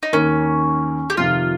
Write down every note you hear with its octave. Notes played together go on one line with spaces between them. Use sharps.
D#4
D#2 D#3 A#3 C#4
G4
F2 C3 D#3 F4